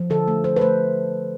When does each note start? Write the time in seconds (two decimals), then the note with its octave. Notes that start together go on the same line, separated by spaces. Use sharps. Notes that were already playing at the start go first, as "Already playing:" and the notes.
Already playing: F3
0.10 D3 A4
0.28 A3
0.44 A3 C5
0.56 B4
0.61 A3 C5